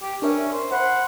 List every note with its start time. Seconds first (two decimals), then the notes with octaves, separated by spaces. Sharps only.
0.02 G4
0.22 C#4 D4 A#4 E5
0.52 C5
0.72 C5 F#5 B5 C6